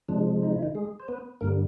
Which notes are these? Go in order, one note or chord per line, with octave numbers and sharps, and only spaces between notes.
C3 F3 G#3 D4
D#4
E4
D#3 D#4
G#3 G#4
C5
B3 B4
G2 D3 G3 A#3 A#4